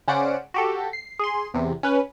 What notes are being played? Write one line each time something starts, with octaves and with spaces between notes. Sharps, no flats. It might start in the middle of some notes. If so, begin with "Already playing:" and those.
C#3 C#4 C5 D5 F#5 D7
F#4 G4 A4
C7
G#4 C6
E2 C3
C#4 B4